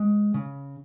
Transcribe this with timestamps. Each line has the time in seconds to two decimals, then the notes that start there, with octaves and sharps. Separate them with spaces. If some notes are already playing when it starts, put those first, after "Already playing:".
Already playing: G#3
0.34 C#3